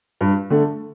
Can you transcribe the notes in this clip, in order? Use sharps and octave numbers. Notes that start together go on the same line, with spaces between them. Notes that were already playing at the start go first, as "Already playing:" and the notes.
G2
D3 A3